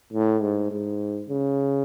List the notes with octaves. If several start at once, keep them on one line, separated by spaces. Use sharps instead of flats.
A2
G#2
G#2
C#3